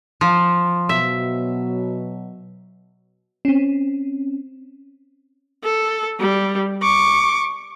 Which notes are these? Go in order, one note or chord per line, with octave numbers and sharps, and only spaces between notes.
F3
B2 F#3 E5
C4 C#4
A4
G3
C#6 D6